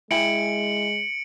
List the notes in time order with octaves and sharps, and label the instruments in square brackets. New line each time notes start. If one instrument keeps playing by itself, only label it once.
[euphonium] G#3 [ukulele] E4 G5 G#5 [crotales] C#7 D7 F#7